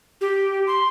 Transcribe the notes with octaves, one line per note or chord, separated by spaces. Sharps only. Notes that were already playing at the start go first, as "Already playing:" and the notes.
G4
C6